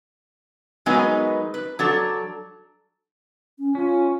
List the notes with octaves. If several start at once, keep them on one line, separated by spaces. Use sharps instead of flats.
F#3 G#3 B3 D#4 A#4 B4
B4
F#3 D4 A4
C#4
C#4 F4